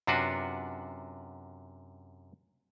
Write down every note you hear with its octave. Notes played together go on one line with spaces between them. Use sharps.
F#2 C3 D4 F4 F#4 B4